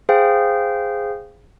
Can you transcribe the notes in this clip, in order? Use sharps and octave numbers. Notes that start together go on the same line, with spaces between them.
G#4 C5 F5 G5